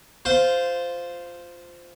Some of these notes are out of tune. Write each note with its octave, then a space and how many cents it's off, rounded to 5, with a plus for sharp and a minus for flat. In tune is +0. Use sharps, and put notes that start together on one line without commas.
F4 +0 C5 -10